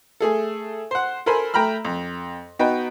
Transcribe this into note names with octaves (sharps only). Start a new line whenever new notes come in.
A3 G#4 A4
C5 F#5
A4 A#4 C5 G#5 B5
A3 G5 A#5 B5 F6
F2
B3 D#4 F#4 B4 G5